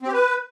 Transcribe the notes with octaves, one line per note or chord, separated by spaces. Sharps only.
C4
G4
B4